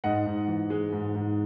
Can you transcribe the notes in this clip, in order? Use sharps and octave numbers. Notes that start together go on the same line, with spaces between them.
G#2 D#5 F#5
G#2
E3
G#3
G#2
G#2